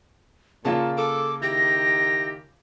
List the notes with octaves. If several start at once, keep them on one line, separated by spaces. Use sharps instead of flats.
A#2 C#3 A#3 F4 A5
A4 D6
D#3 E4 G4 A#6